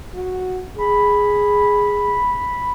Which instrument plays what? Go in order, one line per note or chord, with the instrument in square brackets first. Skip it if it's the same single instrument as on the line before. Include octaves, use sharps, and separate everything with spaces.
[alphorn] F#4
[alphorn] G#4 [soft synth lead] B5